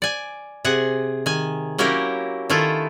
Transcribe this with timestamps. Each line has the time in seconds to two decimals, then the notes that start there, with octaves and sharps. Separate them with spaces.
0.02 D5 G#5
0.65 C3 G#4 F#5
1.26 D#3 G#5
1.78 F#3 A#3 C#4 E4 G4 A#4
2.50 D#3 A3 E4 F4